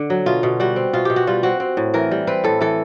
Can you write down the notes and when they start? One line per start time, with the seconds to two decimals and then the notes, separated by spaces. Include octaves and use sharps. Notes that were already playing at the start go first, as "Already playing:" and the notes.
Already playing: D3
0.10 F#3
0.26 B2 F4
0.43 B2
0.60 G3 F#4
0.76 C4
0.93 B2 F4
1.05 B2 G4
1.16 F#4
1.27 G3 F4
1.43 C4 F#4
1.60 C4
1.77 A2
1.94 E3 A#4
2.11 G3
2.27 C4 B4
2.44 A2 A4
2.61 E3 A4